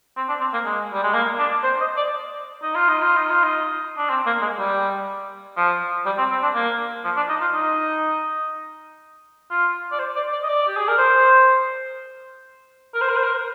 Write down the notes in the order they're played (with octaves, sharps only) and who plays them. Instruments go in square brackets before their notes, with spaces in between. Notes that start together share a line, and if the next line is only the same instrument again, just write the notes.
[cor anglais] C4
D4
C4
A#3
G#3
G3
G#3
A#3
D4
C5
D#5
D5
D#4
F4
D#4
F4
D#4
F4
D#4
D4
C4
A#3
G#3
G3
F3
G3
C4
C4
D4
A#3
F3
D4
D#4
F4
D#4
F4
D5
C5
D5
D5
D#5
D5
G4
G#4
A#4
C5
A#4
C5
A#4
C5
A#4